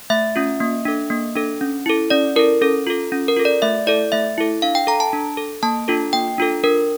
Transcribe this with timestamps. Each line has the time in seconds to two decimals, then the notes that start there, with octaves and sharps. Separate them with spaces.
0.10 A3 E5
0.36 C#4 F4
0.60 A#3
0.85 D4 A4
1.10 A#3
1.35 D4 A4
1.61 C#4
1.86 E4 A4
2.10 C#4 D5
2.36 E4 A4 A#4
2.62 C#4 A4
2.87 F4 A4
3.12 C#4
3.28 A#4
3.36 F4 A4
3.45 D5
3.62 A3 E5
3.87 E4 A4 D5
4.12 A3 E5
4.38 E4 A4
4.62 D4 F5
4.75 G5
4.87 A4 A#5
5.00 A5
5.13 D4
5.37 A4
5.63 A#3 A5
5.88 D4 F4 A4
6.13 A#3 G5
6.38 D4 F4 A4
6.64 D4 A#4